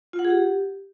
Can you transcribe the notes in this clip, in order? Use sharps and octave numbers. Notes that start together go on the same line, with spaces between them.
F4
F#5
G#4
G4